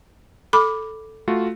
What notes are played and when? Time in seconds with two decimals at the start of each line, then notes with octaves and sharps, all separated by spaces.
0.53 A4 B5 D6
1.28 A3 F4 F#4